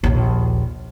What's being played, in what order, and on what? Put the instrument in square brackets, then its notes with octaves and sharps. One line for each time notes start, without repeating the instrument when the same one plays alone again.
[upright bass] A#1 D#2